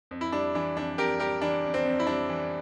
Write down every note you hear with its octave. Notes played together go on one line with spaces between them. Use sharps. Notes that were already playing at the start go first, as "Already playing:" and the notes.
F2
E4
G3 D4
E3 D4
F2 D4
F2 G4 A#4
G3 G4 A#4
E3 D4
F2
C4
F2
E4
G3 D4
E3